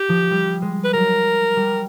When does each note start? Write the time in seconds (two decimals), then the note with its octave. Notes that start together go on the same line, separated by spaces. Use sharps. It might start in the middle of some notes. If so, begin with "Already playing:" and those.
Already playing: G4
0.09 F3
0.31 G3
0.62 G#3
0.84 B4
0.93 F#3 A#4
1.56 G3